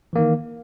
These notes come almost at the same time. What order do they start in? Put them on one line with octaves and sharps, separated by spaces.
E3 A#3 D#3